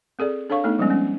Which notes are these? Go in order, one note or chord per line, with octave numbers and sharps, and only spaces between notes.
C4 G#4 A4 D5
D4 A4 C#5 F5 C#6
A3 B3 D#4 A4
F3 G3 G#3 B3 C#4
C4 C#4